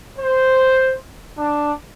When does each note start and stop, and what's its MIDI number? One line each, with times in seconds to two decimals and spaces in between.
0.16 0.96 72
1.37 1.72 62